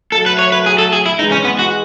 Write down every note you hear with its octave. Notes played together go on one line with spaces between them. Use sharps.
F#3 A3 A4
B4
C#5
B4
G#4
A4
G#4
E4
E3 G#3 D#4
C#4
B3
F#4